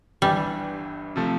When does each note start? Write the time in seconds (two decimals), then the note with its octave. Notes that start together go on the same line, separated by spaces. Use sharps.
0.22 G1 G2 E3 G3
1.16 C3 F3 A3